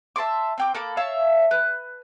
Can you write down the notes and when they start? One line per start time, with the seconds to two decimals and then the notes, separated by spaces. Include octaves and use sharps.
0.16 E5 A5 C6 D6
0.58 C4 G5 D6
0.75 A#3 A4 B5 D6
0.97 C#5 E5 F5 A5
1.51 B4